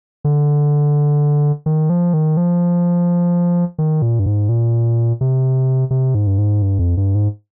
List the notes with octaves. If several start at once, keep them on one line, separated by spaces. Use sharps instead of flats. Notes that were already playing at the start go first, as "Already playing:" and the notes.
D3
D#3
F3
D#3
F3
D#3
A#2
G2
G#2
A#2
C3
C3
G#2
G2
G#2
G2
F2
G2
G#2